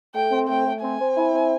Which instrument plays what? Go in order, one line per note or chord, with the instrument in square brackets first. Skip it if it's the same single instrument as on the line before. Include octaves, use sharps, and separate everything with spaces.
[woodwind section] A3 [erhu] G5
[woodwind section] C4
[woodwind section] A3 [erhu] G5
[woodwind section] A3
[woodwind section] C4 [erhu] G#5
[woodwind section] C4
E4
C4